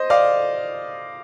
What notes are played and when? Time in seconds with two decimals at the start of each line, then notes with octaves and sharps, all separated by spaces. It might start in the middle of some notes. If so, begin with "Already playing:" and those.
Already playing: C5 D#5
0.10 D5 F5